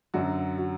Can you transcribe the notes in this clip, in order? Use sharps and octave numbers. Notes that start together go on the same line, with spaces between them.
F#2 D3 F#3 F#4
F#4